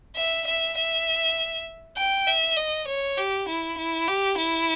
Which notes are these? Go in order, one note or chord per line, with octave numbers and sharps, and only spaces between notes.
E5
E5
E5
G5
E5
D#5
C#5
G4
E4
E4
G4
E4